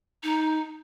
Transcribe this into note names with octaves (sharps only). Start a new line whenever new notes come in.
D#4